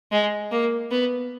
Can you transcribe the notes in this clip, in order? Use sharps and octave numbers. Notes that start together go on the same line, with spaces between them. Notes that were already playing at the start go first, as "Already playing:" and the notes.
G#3
A#3
B3